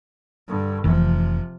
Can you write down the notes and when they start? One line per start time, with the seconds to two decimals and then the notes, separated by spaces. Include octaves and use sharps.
0.48 G2 D3
0.84 F1 C3 E3 F3